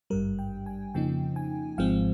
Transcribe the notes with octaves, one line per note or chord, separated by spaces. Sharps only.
G#1 G2 G3 A#4
G5
G#5
F2 C#3 F3 A#3 D#4 G5
G#5
G#1 G#2 F3 G#3 C4 F5